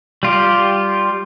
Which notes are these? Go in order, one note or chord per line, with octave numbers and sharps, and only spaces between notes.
G3 F4 G4